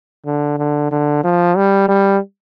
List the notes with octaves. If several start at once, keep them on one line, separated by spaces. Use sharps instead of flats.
D3
D3
D3
F3
G3
G3